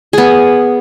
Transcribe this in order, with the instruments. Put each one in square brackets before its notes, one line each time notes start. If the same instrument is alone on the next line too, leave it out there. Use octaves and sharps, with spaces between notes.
[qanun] B3 G#4